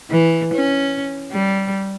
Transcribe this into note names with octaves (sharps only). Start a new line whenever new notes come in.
E3
C#4
G3